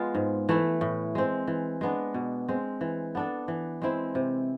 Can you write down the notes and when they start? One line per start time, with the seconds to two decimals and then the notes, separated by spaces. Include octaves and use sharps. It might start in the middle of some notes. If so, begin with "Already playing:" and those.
Already playing: G#3 B3 F4
0.15 G#2
0.49 E3 A3 E4
0.81 A2
1.15 G#3 C4
1.48 E3
1.81 G#3 B3 D4
2.14 B2
2.49 G#3 C4
2.81 E3
3.15 B3 D4 A4
3.48 E3
3.82 G#3 C4 E4
4.15 C3